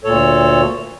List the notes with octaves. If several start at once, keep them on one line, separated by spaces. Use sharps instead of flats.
D2 A#2 A4 C#5